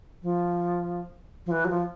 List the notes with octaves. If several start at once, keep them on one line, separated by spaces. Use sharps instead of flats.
F3
F3
E3
F#3
F3